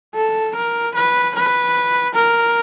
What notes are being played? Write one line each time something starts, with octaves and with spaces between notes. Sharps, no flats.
A4
A#4
B4
B4
A#4